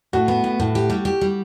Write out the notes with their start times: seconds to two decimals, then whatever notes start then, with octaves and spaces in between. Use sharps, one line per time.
0.13 A2 F#4
0.28 B3
0.44 A2
0.60 A2
0.75 G4
0.90 G3
1.05 G4
1.21 G3